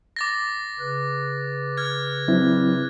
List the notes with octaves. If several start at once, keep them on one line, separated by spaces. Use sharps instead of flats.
D6 A6 A#6
C#3 B4 F#6
F6 G#6
F#3 C4 E4